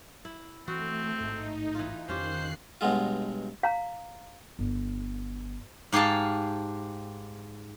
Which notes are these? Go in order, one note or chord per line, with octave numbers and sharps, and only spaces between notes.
E4
E3 A3 C4 F#4
A1 G#2 D#4
E3 F4
F2 D#3 C#4 F4 G4 C5 F#6 C7
G2 B2 F#3 G#3 F4
F5 A#5
G1
G#2 G4 G#4 F5 A5